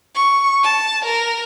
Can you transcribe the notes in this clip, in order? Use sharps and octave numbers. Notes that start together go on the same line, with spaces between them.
C#6
A5
A#4